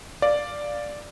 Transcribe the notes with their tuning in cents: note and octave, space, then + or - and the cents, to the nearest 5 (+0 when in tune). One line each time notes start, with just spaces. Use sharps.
D5 +0 F5 +0